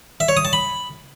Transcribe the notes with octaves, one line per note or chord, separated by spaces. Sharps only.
E5
C#5
D#6
A5
B5